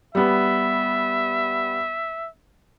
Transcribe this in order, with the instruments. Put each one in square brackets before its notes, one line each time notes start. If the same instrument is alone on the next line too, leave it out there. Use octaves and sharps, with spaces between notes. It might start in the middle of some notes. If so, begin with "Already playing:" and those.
[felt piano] G3 B3 [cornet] E5